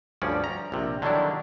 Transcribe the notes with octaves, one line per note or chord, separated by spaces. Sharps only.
D2 G2 F3 C#4 D5
A#5
A#1 C3
D3 D#3 F#3 G3 D4 E4